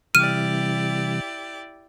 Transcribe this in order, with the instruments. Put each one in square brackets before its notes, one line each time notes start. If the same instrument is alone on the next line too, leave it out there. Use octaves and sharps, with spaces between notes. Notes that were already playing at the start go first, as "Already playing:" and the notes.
[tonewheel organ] C3 E3 G3 [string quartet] E4 G4 D5 [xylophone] F6 D#7